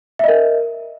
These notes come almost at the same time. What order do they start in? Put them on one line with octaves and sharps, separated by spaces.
E5 D#5 A#4